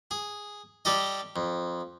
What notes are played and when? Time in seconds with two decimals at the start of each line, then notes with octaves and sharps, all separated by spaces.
0.11 G#4
0.85 G3 G4 A4 D#5
1.36 F2